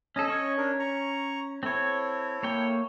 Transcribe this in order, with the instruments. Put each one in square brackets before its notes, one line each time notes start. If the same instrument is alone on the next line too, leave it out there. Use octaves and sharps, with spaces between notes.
[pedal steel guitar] C#4 A4 [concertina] D#5
[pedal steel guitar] C#4 C#5
[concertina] D4 A#4
A#5 C#6
[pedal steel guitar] C4 C#5 [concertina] E4 A4
[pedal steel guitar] A#3 C#5 G5